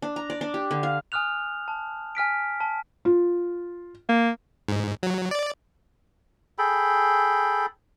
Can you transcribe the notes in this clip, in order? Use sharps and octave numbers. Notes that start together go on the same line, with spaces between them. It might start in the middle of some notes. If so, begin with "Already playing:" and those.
D4
A#5
D5
D4
G4
D3
F5
G#5 D#6 F6 F#6 F7
A5
G#5 F6 B6 D7
A5
F4
A#3
G#2
F#3
D5
G#4 A4 G5 B5